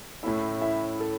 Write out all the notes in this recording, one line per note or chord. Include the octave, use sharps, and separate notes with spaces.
A2 A3 C#4 E4 E5
E4 E5
A4